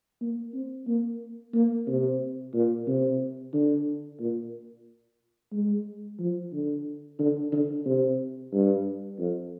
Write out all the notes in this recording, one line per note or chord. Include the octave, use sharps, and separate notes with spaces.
A#3
C4
A#3
A#3
C3
A#2
C3
D3
A#2
G#3
F3
D3
D3
D3
C3
G2
F2